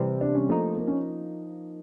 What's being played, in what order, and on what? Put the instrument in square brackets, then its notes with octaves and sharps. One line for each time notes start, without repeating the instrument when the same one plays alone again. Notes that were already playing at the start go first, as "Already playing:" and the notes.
Already playing: [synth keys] C3 E3 G3 C4
[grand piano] D4
C#4
[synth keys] F3 A#3 D#4 [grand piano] A3
[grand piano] A#3
C#4